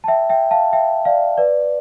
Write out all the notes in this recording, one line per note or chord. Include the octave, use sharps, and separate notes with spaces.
A5
E5 G5
E5 G5
F5 A5
E5 G5
D5 F5
B4 D5